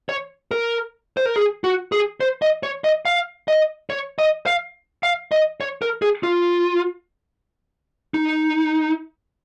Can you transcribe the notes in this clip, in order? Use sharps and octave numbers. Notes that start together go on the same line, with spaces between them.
C#5
A#4
C5
A#4
G#4
F#4
G#4
C5
D#5
C#5
D#5
F5
D#5
C#5
D#5
F5
F5
D#5
C#5
A#4
G#4
F4
D#4